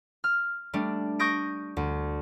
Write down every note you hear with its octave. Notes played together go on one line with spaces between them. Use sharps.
F6
G3 A3 D4
C#6 D#6 G6 A#6 D7
D2